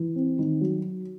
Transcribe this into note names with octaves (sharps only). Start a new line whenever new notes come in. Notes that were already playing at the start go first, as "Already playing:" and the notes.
Already playing: E3
C4
D#3
F#3